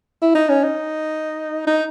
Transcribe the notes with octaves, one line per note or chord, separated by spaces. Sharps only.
E4
D#4
C#4
D#4
D#4